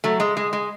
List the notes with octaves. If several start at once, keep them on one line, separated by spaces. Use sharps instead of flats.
F#3 A3
G#3
G#3
G#3